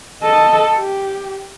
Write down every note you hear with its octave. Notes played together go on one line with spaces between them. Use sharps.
A4 D#5
G4